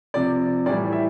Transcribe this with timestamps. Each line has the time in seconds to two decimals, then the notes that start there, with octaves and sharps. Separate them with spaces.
0.14 C3 F3 D5
0.66 A2 E3 G3 D5
0.92 E5